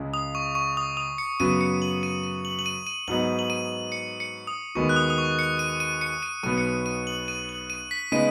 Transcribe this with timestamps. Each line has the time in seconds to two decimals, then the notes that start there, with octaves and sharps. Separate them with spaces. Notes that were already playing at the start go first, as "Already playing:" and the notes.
Already playing: C#2 C#3 G#3
0.14 D#6
0.35 C#6
0.55 C#6
0.77 D#6
0.97 D#6
1.18 C#7
1.40 F#2 C#3 B3 F#4 D#7
1.61 C#7
1.82 F#7
2.03 D#7
2.23 D#7
2.45 F#7
2.59 F#7
2.66 D#7
2.87 D#7
3.08 G#2 F#3 B3 D#4 F#7
3.39 F#7
3.50 D#7
3.92 C#7
4.20 C#7
4.47 D#6
4.75 D#2 D#3 G#3 B3 F#4 C#6
4.89 F#6
4.96 D#6
5.10 D#6
5.18 C#6
5.39 C#7
5.59 D#7
5.80 D#7
6.01 C#7
6.23 D#7
6.43 B1 B2 B3 D#7
6.58 C#7
6.65 D#7
6.86 D#7
7.07 F#7
7.28 D#7
7.49 F#7
7.70 D#7
7.91 B6
8.12 C#3 G#3 B3 D#4 D#7